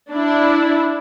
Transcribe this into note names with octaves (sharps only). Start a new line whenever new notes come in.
D4 E4